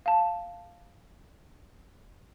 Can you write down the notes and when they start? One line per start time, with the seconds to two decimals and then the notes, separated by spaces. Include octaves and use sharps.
0.06 F5 A5